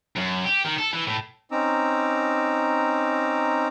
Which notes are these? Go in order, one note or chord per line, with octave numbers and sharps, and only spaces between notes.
F#2
G4
D#3
A4
E3
A2
C4 C#4 D#4 A#5 D6 E6